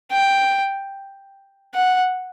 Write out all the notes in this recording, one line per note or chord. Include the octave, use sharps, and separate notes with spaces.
G5
F#5